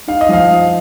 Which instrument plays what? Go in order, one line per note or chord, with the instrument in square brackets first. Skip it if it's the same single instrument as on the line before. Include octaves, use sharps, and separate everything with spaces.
[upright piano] D#4 [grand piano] F5
[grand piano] D#5
[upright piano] F3 [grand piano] F5
[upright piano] F3